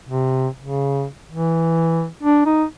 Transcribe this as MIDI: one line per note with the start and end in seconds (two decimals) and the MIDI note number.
0.09 0.48 48
0.61 1.05 49
1.32 2.06 52
2.23 2.42 62
2.46 2.64 63